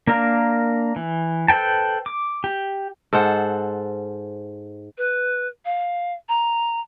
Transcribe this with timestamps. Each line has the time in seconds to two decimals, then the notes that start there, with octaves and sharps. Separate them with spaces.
0.07 A#3 D4 A#4 F5
0.96 E3
1.48 A4 B4 C5 G5 A5
2.06 D6
2.44 G4
3.13 G#2 A4 C5 F#5
4.98 B4
5.65 F5
6.29 A#5